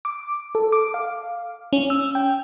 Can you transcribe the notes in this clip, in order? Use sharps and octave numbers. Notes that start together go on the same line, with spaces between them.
D6
A4
D6
F5
C#4
E6
G5